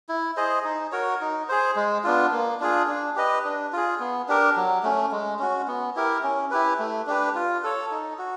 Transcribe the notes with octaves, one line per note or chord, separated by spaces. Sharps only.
E4
G#4 C5 D#5
D#4
F#4 A#4 C#5
D#4
G#4 C5
G#3
B3 D4 F4
A#3
D4 F4 G#4
D4
G4 B4 D#5
D4
F4 G#4
B3
D4 G4 A#4
F#3
A3 C#4
G#3
C#4 F#4
B3
E4 G4 A#4
C#4
E4 G4 B4
A3
D4 G4 B4
F4
A4 C#5
D#4
F#4